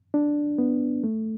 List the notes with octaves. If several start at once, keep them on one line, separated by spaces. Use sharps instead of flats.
D4
B3
A3